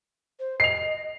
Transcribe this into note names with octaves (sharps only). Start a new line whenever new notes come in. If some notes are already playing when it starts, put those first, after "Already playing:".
C5
D#5 C7 F7